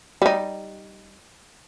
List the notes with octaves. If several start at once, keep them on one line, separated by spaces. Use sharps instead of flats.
G3 D#4